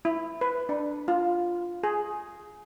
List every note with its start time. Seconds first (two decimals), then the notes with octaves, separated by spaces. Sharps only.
0.05 E4
0.41 B4
0.69 D4
1.08 F4
1.83 G#4